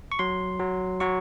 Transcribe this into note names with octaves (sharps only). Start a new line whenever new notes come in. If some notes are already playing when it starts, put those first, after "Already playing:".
C#6
F#3 C6
F#3
F#3 C#6